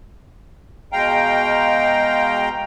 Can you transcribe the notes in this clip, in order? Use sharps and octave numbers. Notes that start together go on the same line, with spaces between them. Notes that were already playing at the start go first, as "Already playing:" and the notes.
B2 G#3 F5 G5 A#5